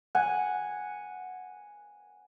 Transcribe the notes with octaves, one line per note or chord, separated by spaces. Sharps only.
F#5 G#5